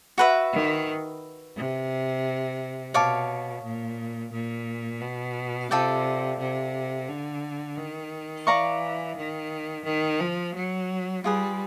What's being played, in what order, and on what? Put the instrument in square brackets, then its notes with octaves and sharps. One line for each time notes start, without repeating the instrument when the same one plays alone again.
[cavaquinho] F#4 B4 E5
[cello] D#3
C3
[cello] B2 [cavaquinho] C#5 F5 A5 D6
[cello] A#2
A#2
B2
[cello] C3 [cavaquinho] F4 A4 D5 G5
[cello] C3
D3
D#3
[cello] E3 [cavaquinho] D5 F5 A#5 C#6
[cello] D#3
D#3
F3
F#3
[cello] G3 [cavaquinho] F4 G#4 B4